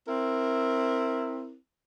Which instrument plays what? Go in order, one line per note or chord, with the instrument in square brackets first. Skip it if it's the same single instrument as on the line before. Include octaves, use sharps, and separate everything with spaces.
[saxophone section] C4 E4 A#4